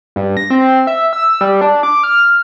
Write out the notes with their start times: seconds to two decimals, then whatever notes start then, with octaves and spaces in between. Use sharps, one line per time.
0.16 G2
0.37 A#6
0.50 C4
0.87 E5
1.13 E6
1.41 G3
1.61 D4
1.83 D6
2.03 F6